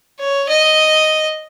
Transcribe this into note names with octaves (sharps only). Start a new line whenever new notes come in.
C#5
D#5